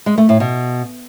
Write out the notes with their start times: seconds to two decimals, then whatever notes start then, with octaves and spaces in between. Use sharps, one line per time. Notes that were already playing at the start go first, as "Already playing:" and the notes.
0.06 G#3
0.18 A3
0.29 A2
0.40 B2